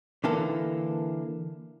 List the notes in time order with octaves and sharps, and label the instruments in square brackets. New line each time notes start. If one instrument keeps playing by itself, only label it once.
[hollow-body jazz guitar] D3 E3 A#3 A4